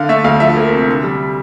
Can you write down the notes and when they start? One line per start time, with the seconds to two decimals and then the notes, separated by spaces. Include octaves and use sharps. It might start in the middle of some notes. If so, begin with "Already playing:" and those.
Already playing: D3 F5
0.09 A3 E5
0.24 D2 F5
0.40 F3 E5
0.56 A#3
0.73 C3
0.88 D3
1.03 G3